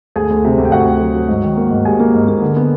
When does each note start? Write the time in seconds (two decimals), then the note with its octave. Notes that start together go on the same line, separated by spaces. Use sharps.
0.16 D2 G#4 G#5
0.30 D2
0.45 C3
0.58 D2
0.65 G5
0.72 D2 F#4 F#5
0.86 D2
1.00 F#3
1.15 F#3
1.29 G#2
1.43 D#3
1.57 A#3
1.71 G#2
1.85 G3 G#4 G#5
2.00 A#3
2.14 G#2
2.29 A#3
2.42 D3
2.56 B3